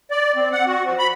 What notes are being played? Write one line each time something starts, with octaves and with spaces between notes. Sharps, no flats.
D5
C4
F#5
F#4
F3
B5